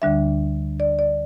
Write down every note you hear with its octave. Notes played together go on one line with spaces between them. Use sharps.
D2 D3 G3 D4 E5
D5
D5